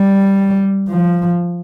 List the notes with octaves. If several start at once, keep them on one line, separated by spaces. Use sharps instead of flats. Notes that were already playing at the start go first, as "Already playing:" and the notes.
Already playing: G3
F3